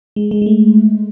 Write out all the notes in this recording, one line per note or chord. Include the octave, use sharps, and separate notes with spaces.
G#3
G#3
G#3
A3